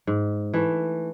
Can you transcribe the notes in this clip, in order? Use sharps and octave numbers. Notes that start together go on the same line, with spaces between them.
G#2
E3 A3